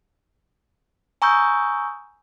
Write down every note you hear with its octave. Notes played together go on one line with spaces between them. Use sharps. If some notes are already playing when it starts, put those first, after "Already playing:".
G#5 A#5 C#6 D#6 E6 G6